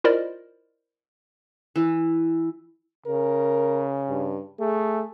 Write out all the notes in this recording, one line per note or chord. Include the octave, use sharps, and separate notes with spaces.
E4 F4 A#4 C5 D5 D#5
E3
C#3 A#4
G2
A3 G#4